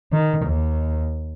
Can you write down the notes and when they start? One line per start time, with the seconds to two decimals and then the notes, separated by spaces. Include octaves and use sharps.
0.12 D#3
0.45 D#2